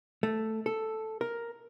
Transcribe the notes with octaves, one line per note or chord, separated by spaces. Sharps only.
A3
A4
A#4